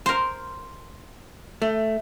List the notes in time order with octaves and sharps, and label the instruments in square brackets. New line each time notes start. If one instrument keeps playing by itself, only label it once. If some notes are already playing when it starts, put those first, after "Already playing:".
[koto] A#4 C5
[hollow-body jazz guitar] A3